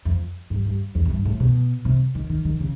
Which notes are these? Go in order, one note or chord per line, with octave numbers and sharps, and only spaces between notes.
F2
G2
G2
E2
G#2
G2
A2
B2
C3
D#3
D#3
D#3
C#3